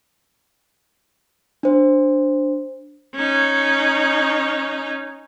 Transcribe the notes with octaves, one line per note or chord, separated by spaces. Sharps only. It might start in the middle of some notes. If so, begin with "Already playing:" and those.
D4 C5
C#4 D#4